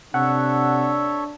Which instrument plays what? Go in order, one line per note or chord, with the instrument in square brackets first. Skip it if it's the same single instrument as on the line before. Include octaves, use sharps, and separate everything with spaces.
[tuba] C3 [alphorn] D4 [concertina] A4 C#5 E5 [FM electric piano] F#5